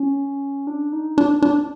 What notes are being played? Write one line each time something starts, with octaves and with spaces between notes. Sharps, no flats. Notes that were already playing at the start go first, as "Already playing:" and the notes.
Already playing: C#4
D4
D#4
D4
D4